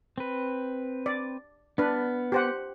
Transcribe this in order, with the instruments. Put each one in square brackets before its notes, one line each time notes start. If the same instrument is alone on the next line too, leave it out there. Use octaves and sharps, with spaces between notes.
[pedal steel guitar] C4 B4
[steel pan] D5
[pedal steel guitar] B3 F6 [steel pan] D4 B4
[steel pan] G4 C5 F#5